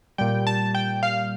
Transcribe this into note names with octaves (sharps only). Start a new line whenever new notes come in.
A#2 G3 G5
A5
G5
F5